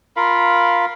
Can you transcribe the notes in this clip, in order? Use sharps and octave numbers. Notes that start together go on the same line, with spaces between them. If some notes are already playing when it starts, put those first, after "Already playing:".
F4 A#4 F5 B5